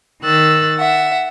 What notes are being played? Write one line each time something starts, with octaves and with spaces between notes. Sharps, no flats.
D#3 E6 F#6 A6
E5 F#5